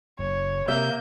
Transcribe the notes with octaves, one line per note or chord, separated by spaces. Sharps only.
F#1 C#5
C3 A#3 E5 G6